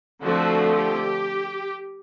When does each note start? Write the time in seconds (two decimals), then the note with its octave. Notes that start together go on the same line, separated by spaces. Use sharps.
0.22 D3 F3 A3 C4 F#4
0.76 G4